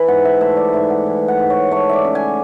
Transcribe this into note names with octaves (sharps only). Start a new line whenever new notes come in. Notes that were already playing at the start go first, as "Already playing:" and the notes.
Already playing: E3 B5
G#2 F#5
E5
A3 E5
D5
G#2 E5
F#5
E3
F#5
G#2
C#5
A3 C#5
D5 E5
C#3
G#5